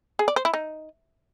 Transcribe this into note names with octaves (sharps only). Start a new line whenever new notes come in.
G#4
D5
C5
E4
D#4